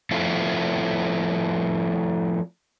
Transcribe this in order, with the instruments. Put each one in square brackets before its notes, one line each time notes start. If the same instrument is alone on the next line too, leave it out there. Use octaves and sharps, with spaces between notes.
[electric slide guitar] F3 A3 C4 E4 F4